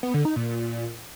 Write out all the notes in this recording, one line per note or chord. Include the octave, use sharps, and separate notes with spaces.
B3
D3
D#4
A#2